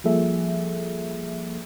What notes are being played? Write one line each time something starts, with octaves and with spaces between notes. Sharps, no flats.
F3 G3 A#3 G#4 A4 E5